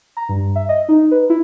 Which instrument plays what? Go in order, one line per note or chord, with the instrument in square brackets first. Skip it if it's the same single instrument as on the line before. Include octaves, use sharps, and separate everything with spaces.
[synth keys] A#5
G2
E5
D#5
D#4
B4
E4